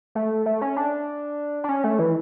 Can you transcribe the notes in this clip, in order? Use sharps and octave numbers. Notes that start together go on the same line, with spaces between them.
A3
A3
C#4
D4
D4
C#4
A3
E3